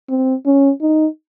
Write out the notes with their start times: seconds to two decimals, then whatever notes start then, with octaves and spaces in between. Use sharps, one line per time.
0.09 C4
0.45 C#4
0.81 D#4